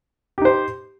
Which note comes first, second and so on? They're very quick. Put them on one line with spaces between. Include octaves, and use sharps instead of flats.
G4 D#4 C5